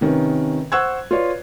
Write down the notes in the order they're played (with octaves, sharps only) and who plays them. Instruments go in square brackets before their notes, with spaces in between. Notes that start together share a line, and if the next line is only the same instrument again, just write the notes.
[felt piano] C3 D#3 C#4 A#4 B4
C5 F#5 C#6 E6 F#6 G#6
F4 B4 C#5 D5